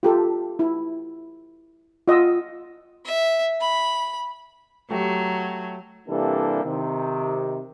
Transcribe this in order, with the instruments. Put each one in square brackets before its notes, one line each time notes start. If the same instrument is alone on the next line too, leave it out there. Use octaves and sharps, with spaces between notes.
[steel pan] F4 G4 A4
E4
F4 D#5 F#5 E6
[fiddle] E5
B5
[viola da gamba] F#3 [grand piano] A3 G4
[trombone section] C3 E3 G3 A#3 D4 A4
C3 D#3